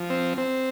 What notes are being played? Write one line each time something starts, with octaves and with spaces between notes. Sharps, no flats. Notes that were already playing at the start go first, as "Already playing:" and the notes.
Already playing: F3
C4
C4